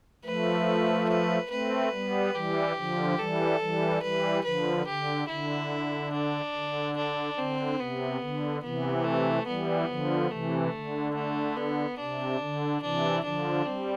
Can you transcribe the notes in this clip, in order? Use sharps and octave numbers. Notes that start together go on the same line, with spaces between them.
F3 A3 B4
B4
A3 C4 B4
G3 B3
E3 G3 G4
D3 F3
E3 G3 A4
E3 G3
E3 G3 B4
D3 F3 B4
D3 G4
D3 E4
D4
D3
D4
D3 C4
C3 B3
D3
C3 E3 B3
A3
E3 G3 B3
D3 F3
C3 E3 A3
D3
A3
B3
C3 D4
D3
C3 E3 D4
D3 F3 D4
G3 C4